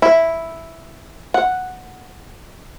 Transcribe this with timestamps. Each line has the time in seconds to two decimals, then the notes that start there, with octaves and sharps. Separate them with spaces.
0.02 E4
1.34 F#5